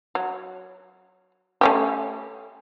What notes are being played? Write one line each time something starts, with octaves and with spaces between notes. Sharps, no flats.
F#3
A3 C#4 G4